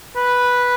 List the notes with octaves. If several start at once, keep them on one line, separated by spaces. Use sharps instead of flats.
B4